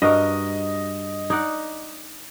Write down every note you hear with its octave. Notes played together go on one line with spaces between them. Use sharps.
G2 F#4 A#4 D#5
D#4 D5 F#5